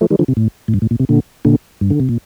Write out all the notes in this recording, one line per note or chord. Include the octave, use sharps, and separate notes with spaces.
F3 A3
D#3 G3
D3 F3
C3
A2
A2
G2
A2
A#2
C3
A#2 D3
A#2 D3
G2
D3
C3
A#2